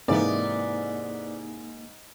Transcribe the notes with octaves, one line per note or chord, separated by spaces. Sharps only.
G#2 C3 E3 A#3 B3 D#4 D5